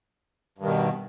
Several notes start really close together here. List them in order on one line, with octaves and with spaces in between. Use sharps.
G2 D#3 B2